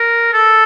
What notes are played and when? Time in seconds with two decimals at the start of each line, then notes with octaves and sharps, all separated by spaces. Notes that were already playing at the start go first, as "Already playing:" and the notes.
Already playing: A#4
0.33 A4